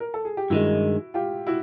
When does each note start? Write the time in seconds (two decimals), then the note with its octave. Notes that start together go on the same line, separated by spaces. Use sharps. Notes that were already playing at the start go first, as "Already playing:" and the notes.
0.00 A#4
0.14 A4
0.25 G#4
0.37 G4
0.50 G2 D#3 G#3 E4 F#4
1.14 F4 G4
1.47 E4 F#4